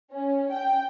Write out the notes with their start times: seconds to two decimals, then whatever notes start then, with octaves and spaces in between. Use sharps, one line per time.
0.12 C#4
0.51 G5